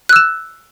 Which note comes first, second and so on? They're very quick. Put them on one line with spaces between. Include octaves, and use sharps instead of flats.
F#6 E6 E7